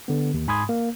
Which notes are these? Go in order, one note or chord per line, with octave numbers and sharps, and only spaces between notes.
D3 B3
D#2
G#2 G#5 B5 C6 D#6 G#6
A#3